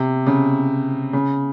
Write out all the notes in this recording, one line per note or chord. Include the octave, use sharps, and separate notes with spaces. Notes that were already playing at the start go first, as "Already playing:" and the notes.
Already playing: C3
C#3
C#3